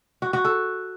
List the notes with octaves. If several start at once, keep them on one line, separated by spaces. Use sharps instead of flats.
F#4
F#4
A4